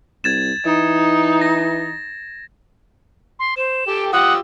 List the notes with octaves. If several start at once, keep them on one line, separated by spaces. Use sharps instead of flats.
C2 G#6 A6 E7
E3 D#4
A#6
C6
C5 E7
G4 A4 G5
F4 G4 F#5 D#6 E6